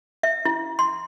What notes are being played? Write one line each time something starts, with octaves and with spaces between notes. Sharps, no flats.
E5
E4
C6